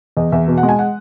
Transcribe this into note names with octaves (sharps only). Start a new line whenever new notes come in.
E2 D#5
E2 E5
B2
F#5
G#3
G#5
F#5